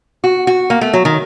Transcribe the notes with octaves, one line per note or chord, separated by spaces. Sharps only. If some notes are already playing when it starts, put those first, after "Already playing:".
F#4
F#4
A#3
A3
F#3
D#3